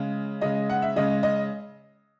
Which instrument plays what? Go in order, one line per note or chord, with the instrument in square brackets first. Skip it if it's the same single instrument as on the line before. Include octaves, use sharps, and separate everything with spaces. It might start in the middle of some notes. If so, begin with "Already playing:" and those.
Already playing: [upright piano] C#3 G#3
C#3 G#3 D#5
F#5
E5
C#3 G#3 D#5
D#5